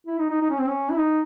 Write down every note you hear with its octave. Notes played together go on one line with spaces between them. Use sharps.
E4
D#4
D#4
D#4
C#4
C4
C#4
E4
D#4